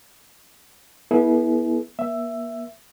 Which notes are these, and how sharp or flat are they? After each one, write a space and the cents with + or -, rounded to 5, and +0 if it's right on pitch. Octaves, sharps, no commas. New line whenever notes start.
B3 -25 E4 -15 G#4 +40
A#3 +40 E5 +10